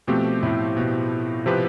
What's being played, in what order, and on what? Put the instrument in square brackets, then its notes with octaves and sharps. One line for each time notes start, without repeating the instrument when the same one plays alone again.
[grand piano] B2 [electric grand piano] F3 A3 C4 G4
[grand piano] A2
B2
[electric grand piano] C3 F3 C4 G4 B4